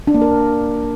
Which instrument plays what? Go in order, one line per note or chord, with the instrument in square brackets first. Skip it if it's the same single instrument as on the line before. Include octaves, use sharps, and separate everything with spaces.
[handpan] D4
A#3
A#4